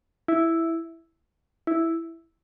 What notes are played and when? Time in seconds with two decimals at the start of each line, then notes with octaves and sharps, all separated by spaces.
0.28 E4
1.67 E4